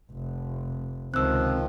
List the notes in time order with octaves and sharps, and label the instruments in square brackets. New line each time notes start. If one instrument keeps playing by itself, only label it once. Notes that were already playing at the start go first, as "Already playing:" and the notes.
[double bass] F1
[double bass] C#2 [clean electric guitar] C3 C4 [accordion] D#3 F3 [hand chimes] E6 F#6